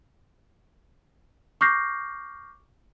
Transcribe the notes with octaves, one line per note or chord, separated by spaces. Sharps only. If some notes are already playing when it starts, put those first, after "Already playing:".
C#6 D6 F6 G6 A#6 C7